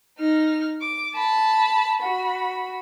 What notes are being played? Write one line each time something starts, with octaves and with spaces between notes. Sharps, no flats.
D#4 F6
D6
A5 B5
F#4 B5